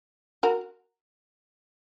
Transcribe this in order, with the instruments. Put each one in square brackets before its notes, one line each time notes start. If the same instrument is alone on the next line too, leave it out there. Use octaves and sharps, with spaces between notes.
[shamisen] F#4 A#4